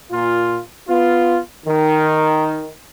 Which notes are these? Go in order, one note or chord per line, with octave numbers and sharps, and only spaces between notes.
A#2 F4
B3 F4
D#3